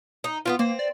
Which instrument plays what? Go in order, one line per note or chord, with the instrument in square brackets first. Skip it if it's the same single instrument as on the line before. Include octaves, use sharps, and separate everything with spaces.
[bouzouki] D#4
B3 C4 F4
[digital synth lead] A#3 [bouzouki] C4
[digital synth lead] D5